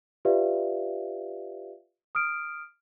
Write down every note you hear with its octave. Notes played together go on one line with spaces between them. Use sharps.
F4 G4 B4 D5 E5 F5
D#6 F6 D7